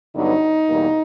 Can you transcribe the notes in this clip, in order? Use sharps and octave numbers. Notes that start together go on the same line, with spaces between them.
G2 D3 F#3 B3 D#4
E2 B2 G3 A#3